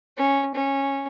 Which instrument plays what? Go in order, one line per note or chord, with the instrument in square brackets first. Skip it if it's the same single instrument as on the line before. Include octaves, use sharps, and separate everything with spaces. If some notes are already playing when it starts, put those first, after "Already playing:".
[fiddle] C#4
C#4